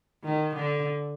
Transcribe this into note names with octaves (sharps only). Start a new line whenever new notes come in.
D#3
D3